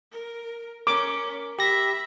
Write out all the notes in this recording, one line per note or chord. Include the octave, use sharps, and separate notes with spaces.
A#4
C#4 A#4 D6
G4 E5 B5 A#6